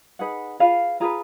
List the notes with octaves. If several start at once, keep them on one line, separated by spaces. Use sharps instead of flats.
D#4 G#4 B4 F#5
F4 G#4 B4 F5
F4 G#4 B4 A#5